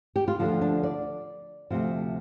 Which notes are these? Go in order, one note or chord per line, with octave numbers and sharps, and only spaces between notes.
G4
F4
D2 D3 F3 D4
D4
D5
D2 C3 F3